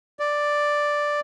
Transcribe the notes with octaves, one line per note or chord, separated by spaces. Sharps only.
D5